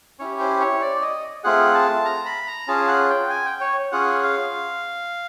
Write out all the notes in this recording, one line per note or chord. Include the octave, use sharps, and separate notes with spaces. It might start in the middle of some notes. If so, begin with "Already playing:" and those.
C#4 E4 G4 C#5
C5
C#5
D5
D#5
A3 C4 F4 G#4 F#5
A5
A#5
B5
A#5
C#4 F4 G#4 A5
F#5
G5
G#5
G5
C#5
C#4 F4 G#4 F#5
F5